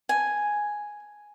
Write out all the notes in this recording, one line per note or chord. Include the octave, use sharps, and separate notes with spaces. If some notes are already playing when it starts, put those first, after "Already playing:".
G#5